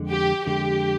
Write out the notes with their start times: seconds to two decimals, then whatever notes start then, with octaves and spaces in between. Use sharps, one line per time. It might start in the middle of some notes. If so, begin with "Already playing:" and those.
Already playing: F2 D3 G#3
0.09 G4
0.46 F2 D3 G#3 G4